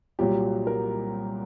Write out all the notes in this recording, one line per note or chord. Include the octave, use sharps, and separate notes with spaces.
C2 A#2 F#3 G4
A#4